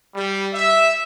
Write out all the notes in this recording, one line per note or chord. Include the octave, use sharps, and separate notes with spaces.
G3
E5